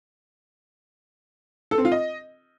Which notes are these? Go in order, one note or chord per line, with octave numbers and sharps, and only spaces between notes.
A4
C4
F4
D#5